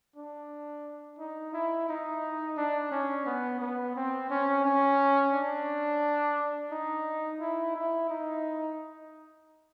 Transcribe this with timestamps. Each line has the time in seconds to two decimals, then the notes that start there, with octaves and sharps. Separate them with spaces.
0.16 D4
1.19 D#4
1.53 E4
1.89 D#4
2.57 D4
2.92 C#4
3.26 B3
3.60 B3
3.96 C4
4.30 C#4
4.65 C#4
5.34 D4
6.71 D#4
7.40 E4
7.76 E4
8.10 D#4